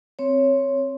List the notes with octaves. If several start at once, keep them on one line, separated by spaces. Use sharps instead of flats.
C4 C#5